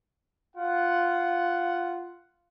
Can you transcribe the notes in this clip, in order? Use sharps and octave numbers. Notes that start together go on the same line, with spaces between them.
F4 F#5